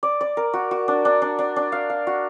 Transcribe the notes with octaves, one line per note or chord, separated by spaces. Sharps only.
D5
D5
A#4
F#4
F#4
D4
D4
D4
D4
D4
F5
F5
F#4